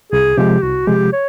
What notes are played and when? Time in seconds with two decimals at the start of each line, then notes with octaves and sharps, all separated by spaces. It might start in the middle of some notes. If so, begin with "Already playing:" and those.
0.12 C2 G#4
0.37 C3 F3 G#3 G4
0.62 C2 F#4
0.87 C3 F3 G#3 G4
1.13 C#5